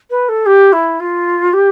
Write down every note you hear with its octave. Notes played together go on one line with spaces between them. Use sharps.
B4
A4
G4
E4
F4
G4